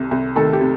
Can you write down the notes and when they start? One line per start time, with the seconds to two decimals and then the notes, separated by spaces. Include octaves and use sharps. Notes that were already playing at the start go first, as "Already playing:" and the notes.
Already playing: C2 C3
0.11 C2
0.36 D#3 A3 A4
0.53 G4
0.61 C3